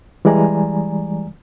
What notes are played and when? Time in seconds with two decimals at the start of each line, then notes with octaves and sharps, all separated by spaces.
0.25 E3 G3 G#3 D5 G#5 A#5